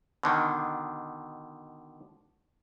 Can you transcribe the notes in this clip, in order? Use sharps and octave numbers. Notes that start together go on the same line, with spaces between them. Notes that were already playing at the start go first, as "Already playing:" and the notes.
B2 D3 D#3